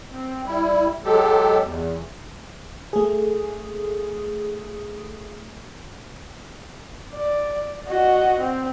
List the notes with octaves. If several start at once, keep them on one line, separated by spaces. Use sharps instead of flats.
C4
G3 E4
F#3 G#3 G4 A4
E2
A3 G#4
D5
F#4 D#5
C4